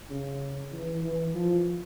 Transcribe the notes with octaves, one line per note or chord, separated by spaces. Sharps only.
C#3
E3
E3
F3